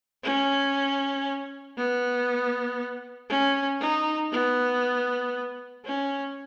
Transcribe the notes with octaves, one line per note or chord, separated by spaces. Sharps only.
C#4
B3
C#4
D#4
B3
C#4